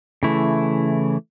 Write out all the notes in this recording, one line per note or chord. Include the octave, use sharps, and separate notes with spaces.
C#3 E3 A3 E4